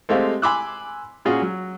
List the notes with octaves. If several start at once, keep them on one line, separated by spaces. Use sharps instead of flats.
G#3 A3 C4 G4 F5
G#5 B5 C6 D6 E6 F#6
A#2 C#4 F4 F#4 G#4
F#3